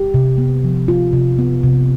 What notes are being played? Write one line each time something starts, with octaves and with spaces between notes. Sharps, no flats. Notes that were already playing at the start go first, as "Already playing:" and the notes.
Already playing: G4
C3
B3
F3
F4
C3
B3
C3